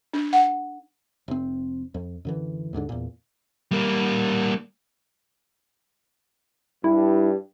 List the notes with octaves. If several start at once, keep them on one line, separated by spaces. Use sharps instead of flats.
D4
F#5
F1 C4
F2
F#2 D3 E3
D#2 G#2 D3 D4
E2 A#2
G3 A#3
G2 E4